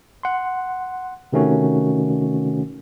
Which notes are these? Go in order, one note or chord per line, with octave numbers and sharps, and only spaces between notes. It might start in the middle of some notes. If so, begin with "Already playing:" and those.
F#5 C6
C3 D#3 A3 C#4 F#4